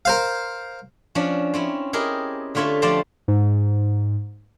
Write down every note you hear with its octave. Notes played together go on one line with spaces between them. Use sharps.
A#4 C5 F5
F3 C#4 D4
C4 C#4 E4
E4 G4 G#4 A#4 D#5
D3 A3 F4 C#5 E5 B5
F3 A3 G4 C5 D5 A5
G#2